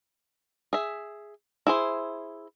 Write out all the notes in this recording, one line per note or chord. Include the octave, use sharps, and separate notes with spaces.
G#4 E5
E4 G#4 C5